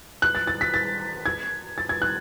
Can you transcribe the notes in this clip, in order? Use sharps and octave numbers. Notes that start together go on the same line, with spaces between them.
F#6
A6
A6
B6
A6
G#6
A6
G#6
F#6